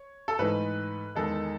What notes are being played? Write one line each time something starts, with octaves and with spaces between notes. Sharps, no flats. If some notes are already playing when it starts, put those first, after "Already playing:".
Already playing: C#5
A4
G#2 E3 A3 D#4 B4
E2 D#3 G#3 A4